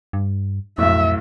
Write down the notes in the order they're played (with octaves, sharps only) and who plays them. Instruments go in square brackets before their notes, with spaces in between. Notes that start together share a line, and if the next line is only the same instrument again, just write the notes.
[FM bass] G2
[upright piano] B1 A2 [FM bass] F2 [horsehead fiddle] E5